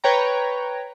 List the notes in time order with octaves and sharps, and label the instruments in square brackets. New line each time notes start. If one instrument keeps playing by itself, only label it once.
[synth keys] B4 C#5 G5 A#5